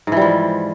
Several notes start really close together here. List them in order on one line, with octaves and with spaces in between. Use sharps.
G#2 E3 G3 F3